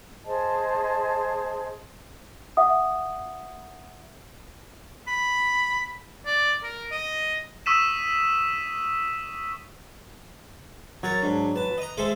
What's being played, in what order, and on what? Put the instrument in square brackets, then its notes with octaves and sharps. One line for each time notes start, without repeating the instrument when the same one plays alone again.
[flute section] G#4 C5 D#5 A5
[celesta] E5 F#5 D#6
[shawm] B5
D5
A#4
D#5
[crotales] C#6 D#6 E6 B6 D#7 E7
[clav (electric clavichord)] F#3 [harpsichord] A#4 C#5 [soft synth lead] A6
[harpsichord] G#2 [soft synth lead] D4
[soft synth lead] B4 [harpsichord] A5
[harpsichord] D#5 A#5
[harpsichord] G#3 A4 C5 [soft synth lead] E5